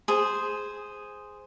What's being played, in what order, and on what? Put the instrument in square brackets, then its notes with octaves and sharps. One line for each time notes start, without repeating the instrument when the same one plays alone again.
[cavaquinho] G#4 C5